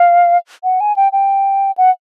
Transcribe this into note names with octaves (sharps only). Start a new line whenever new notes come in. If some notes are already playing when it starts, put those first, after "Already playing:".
Already playing: F5
F#5
G#5
G5
G5
F#5